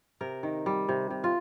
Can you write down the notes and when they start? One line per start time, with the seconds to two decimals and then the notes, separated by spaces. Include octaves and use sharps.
0.21 C3 A#4
0.43 D#3
0.66 G3
0.89 C3
1.10 C3
1.24 F4